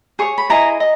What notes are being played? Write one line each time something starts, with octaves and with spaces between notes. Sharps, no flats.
G#4 C#5 C#6
B5
E4 G#4 D#5 A#5
D#5